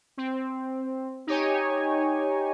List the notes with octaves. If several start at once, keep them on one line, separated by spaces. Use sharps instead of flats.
C4
D#4 G4 C#5 G#5